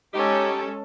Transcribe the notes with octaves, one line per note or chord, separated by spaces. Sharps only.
G#3 C#4 D#4 G4 A4